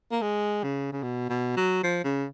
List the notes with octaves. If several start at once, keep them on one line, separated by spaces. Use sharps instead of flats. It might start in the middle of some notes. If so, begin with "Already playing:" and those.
A#3
G#3
C#3
C#3
B2
B2
F#3
F3
C#3